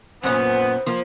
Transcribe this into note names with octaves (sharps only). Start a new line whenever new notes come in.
F#2 A#2 B3 C#4 C5
F3 A#3